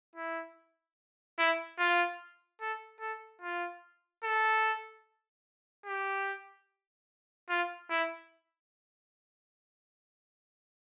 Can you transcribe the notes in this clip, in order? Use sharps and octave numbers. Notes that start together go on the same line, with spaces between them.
E4
E4
F4
A4
A4
F4
A4
G4
F4
E4